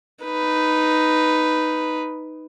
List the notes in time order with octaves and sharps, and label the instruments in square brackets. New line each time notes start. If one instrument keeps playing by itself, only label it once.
[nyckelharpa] D#4 B4